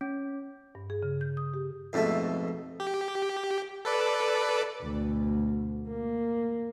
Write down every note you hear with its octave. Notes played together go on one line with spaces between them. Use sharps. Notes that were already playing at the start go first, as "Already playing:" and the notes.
C#4
G2
G#4
C#3
G6
D#6
G4
F2 G#2 B2 A3
G4
A4 B4 D5
D2 B2
A#3